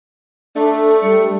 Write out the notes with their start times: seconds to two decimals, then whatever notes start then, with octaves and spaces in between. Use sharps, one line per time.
0.55 A3 D4
1.02 G3 C#7